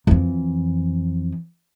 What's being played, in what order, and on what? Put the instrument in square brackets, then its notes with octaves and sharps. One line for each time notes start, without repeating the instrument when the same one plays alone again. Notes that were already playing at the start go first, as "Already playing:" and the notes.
[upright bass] F2 E3